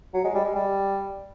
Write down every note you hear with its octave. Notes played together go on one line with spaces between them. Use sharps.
F#3
G#3
G3
G#3
G3